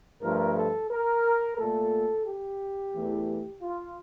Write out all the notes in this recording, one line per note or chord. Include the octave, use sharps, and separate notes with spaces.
G2 F3 A3 A#4
A4
A#4
A#2 A3 A4
G4
E2 E3 A3
F4